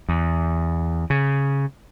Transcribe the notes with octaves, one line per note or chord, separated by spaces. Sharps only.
E2
C#3